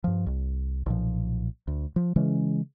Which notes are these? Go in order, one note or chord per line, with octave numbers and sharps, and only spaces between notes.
G2 F3
C2
B1 A#2 F3
D2
F3
C#3 E3 G#3 C#4